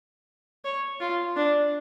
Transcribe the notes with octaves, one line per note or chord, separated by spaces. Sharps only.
C#5
F4
D4